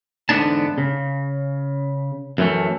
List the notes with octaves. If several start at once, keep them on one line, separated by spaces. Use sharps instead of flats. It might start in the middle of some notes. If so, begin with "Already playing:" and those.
E2 G#2 D3 B3 D4 A5
C#3
F#2 E3 A3